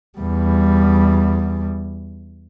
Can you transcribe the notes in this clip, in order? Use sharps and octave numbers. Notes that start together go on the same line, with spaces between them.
E2 G3